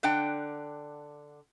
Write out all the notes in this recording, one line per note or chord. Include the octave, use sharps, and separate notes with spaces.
D3 D4 F#5 G5